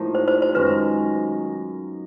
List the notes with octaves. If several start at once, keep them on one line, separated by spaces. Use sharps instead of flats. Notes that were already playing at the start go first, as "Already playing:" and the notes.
Already playing: A2 F3 A#3 D#4
C5
C5
C5
F#2 D#3 G#3 B4